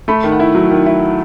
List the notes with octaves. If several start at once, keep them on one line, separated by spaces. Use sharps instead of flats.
A3 B5
D#3
F#5
E4
F#3
D#3
E4